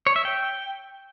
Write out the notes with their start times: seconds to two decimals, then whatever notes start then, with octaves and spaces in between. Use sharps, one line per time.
0.07 C#5
0.16 E5
0.25 G5